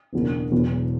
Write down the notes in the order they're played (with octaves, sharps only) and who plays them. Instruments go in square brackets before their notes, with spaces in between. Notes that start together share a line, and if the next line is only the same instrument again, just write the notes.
[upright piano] F#1 E2 B2 A#3 D4
E1 E2 B2 F#3 B3